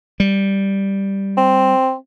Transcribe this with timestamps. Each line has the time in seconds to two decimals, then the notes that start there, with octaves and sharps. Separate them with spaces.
0.20 G3
1.37 C4